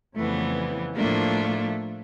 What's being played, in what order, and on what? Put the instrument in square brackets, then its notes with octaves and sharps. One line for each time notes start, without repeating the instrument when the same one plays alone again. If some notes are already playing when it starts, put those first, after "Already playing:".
[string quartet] F2 C#3 E3 G3 B3 [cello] A3
[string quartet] A2 F3 A#3 D4 F4 [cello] A3